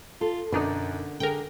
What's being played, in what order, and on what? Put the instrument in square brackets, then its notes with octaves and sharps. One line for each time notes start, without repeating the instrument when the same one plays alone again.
[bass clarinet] F4 [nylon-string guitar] A4
[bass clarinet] F#2 [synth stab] B2 D4 D#4 [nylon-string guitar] D3 A#4 D5
[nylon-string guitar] D3 G#4 [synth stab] A#4 G5